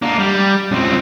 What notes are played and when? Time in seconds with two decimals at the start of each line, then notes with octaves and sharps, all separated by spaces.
0.02 D3 A#3
0.19 G3
0.72 C#2 C4